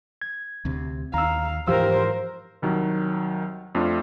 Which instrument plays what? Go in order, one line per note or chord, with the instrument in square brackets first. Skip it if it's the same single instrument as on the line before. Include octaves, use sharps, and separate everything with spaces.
[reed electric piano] G#6
[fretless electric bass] D2 C3
[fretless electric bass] D#2 [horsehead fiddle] F5 [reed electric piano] A#5 E6
[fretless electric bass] G#2 E3 F3 [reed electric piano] G4 F5 E6 [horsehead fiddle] A#4 C5
[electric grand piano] C2 D#3 F#3
F2 A3 D4 F4